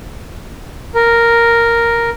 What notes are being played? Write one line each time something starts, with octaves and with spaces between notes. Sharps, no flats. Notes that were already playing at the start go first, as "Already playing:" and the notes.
A#4